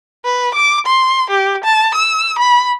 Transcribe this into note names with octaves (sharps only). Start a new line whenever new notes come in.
B4
D6
C6
G4
A5
E6
B5